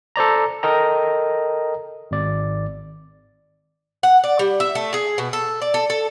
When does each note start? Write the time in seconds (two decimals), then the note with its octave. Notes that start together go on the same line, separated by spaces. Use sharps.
0.16 A4 C5 D5 A#5
0.63 A4 A#4 D#5 G5 A#5
2.11 G#1 D5
4.03 F#5
4.24 D5
4.39 G3
4.60 E5
4.75 A3
4.94 G#4
5.18 B2
5.33 A4
5.62 D5
5.74 A4
5.90 A4